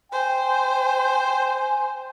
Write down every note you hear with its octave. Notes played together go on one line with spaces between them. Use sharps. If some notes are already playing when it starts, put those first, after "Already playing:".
C5 G5 G#5